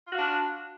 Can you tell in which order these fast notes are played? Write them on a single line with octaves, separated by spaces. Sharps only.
F4 F#4 F5 D4